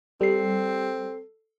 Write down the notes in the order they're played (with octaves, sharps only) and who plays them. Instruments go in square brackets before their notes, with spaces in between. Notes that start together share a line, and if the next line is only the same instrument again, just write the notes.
[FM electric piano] G3 [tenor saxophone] C4 [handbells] A4 C7